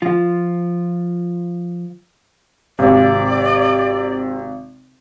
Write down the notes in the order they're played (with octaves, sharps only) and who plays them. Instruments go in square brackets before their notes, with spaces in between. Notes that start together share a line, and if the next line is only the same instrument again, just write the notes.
[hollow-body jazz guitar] F3 F4
[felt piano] G#1 [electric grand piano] C3 [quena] D5